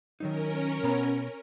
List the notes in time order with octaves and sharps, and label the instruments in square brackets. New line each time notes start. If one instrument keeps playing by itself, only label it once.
[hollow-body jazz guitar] D#3 F#3 D#4 [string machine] C#4 A#4
[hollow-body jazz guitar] B2 B3 A#5